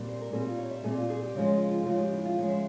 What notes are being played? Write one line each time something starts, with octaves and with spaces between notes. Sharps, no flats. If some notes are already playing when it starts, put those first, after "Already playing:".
Already playing: A#2 G3 C4
C5
A#4
A#2 G3 C4 G#4
F4
C#5
E5
A#2 G3 C4 G#4
F4
G#4
G4
C#3 F3 G#3
F4
F4
C#3 F3 G#3 F4
G4
E4
F4
C#3 F3 G#3 C#5
E5